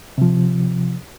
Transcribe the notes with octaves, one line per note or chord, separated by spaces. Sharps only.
C3 F3